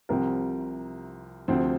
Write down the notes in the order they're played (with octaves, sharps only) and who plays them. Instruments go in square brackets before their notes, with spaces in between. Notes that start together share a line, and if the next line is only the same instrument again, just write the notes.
[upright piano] C2 C3 F3 C4 A#4
D2 C3 F3 C4 C5